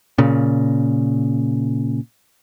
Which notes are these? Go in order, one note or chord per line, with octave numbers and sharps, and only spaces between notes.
A#2 C#3